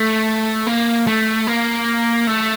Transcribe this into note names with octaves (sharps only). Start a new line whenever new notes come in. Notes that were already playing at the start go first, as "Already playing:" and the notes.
Already playing: A3
A#3
A3
A#3
A3